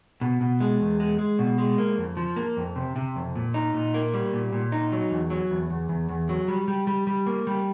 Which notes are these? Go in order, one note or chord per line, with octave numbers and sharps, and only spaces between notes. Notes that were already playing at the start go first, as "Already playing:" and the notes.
B2
B2
G#3
E2
G#3
G#3
B2
G#3
A#3
F2
F3
A#3
F2
C3
C3
F2
A#2
D#4
A#2
A#3
G3
A#2
A#2
D#4
F#3
E2
F#3
E2
E2
E2
E2
F#3
G3
G3
G3
G3
A#3
G3